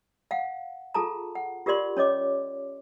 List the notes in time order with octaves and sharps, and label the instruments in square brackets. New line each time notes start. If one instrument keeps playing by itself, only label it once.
[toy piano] F5 F#5
F4 G#4 A4 A5 A#5
F#5
F4 G4 A#4 D5 C6
C#4 C#5 D#5 D6